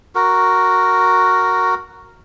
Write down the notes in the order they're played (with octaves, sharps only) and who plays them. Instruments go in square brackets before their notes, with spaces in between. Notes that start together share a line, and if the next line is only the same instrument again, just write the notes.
[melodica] F#4 A#4